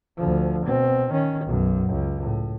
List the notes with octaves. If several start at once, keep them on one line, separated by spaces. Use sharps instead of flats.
D2 F3
B2 C4
D#3 C#4
B1 F#2
C#2
A2